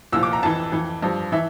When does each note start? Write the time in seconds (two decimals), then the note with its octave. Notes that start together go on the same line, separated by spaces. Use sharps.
0.12 C2 A#2 F3 E6
0.23 D6
0.33 A#5
0.43 F2 E3 A5
0.72 F2 E3
1.02 G2 F3
1.32 E3 E5